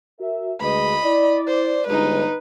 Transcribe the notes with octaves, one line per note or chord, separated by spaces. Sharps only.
F#4 A#4 E5
D2 G#3 B4 D#5 B5
E4 D5
C5
G1 G#3 D#4 B4